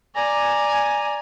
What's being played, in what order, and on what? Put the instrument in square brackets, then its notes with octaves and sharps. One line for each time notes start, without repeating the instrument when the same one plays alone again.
[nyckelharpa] D5 A#5 [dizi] G#5